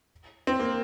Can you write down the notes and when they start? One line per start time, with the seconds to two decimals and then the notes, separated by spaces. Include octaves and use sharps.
0.47 C4
0.60 A#3